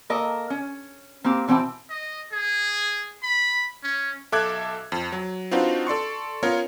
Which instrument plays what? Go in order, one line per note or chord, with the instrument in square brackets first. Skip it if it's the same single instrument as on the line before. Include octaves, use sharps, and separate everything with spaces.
[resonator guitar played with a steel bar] A#3 A4 A#4 D#5
C#4
A#3 C4 G4
B2 E3 C4 A4 G5 A5
[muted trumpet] D#5
G#4
B5
C#4
[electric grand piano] B1 A4 E5 D6 F#6 G#6
F2
F#3
C4 D4 D#4 F4 F#4 B4
A4 D5 C6 C#6
B3 C#4 F4 A#4 C#5